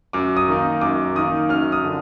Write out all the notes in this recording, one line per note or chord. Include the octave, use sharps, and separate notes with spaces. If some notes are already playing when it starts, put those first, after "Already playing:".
F#2 D6
D#6
D#3 A#3 D#4
F#2 D6
D#3 A#3 D#4 D#6
F#2 F6
D#6
D3 F3